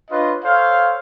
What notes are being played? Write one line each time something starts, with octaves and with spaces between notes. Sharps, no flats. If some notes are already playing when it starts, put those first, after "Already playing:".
D4 F4 B4 C#5 D#5
A4 C5 C#5 F5